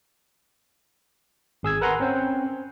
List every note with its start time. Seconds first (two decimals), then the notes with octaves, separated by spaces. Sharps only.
1.63 G#1 G#4 E6 G#6
1.81 A#4 B4 F#5 G#5 A#5 C6
2.00 C4 C#4 C5